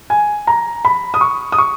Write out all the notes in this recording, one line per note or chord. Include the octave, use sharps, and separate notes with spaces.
G#5
A#5
B5
D#6
C#6
D#6
C#6